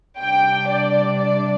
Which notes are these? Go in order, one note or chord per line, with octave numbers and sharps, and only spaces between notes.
C3 G3 D4 G5
D5
D5